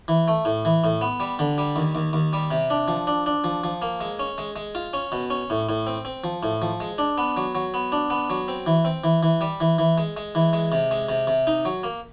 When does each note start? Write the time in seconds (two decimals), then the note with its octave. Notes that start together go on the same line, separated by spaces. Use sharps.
0.08 E3
0.28 A3
0.45 A2
0.65 E3
0.84 A2
1.01 B3
1.20 G3
1.39 D3
1.58 G3
1.76 D#2
1.95 D#2
2.13 D#2
2.33 G3
2.51 C3
2.70 D4
2.88 F3
3.07 D4
3.26 D4
3.44 F3
3.64 F3
3.82 A#3
4.00 G#3
4.19 C#4
4.38 G#3
4.56 G#3
4.75 F4
4.93 C#4
5.12 B2
5.30 C#4
5.50 A2
5.69 A2
5.87 C4
6.05 C4
6.24 F3
6.43 A2
6.62 F3
6.80 G#3
6.98 D4
7.18 B3
7.37 F#3
7.55 F#3
7.74 B3
7.92 D4
8.10 B3
8.30 F#3
8.48 C4
8.67 E3
8.85 C4
9.04 E3
9.23 E3
9.41 G3
9.60 E3
9.79 E3
9.98 G#3
10.17 G#3
10.35 E3
10.53 G#3
10.72 C3
10.91 G#3
11.09 C3
11.27 C3
11.47 D#4
11.65 F#3
11.83 A#3